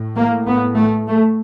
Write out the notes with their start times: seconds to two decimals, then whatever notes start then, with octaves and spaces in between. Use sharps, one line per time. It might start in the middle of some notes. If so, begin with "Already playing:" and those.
Already playing: A2
0.16 A#3
0.46 B3
0.76 A3
1.06 A3